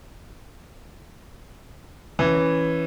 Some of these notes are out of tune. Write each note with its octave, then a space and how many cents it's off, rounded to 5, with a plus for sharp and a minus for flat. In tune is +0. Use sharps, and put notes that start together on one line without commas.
E3 +0 C#4 +0